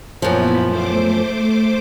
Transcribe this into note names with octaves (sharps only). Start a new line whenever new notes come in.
F#2 A#2 F3 B3 E4
A3 C5 D6